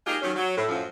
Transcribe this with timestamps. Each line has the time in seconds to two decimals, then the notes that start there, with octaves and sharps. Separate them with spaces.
0.07 G#3 A#3 D#4 F4 G4 G#4
0.22 D#3 F#3 C#4
0.36 F#3
0.57 A2
0.69 F#2 A2 F3